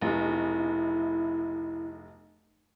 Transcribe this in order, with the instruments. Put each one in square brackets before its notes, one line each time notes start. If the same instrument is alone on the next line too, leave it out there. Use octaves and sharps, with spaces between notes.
[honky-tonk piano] F1 B1 [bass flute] E4